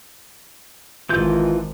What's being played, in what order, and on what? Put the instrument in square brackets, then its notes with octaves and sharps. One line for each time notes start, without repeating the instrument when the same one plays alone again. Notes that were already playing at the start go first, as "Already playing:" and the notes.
[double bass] G#1 [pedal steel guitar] E3 F4 G6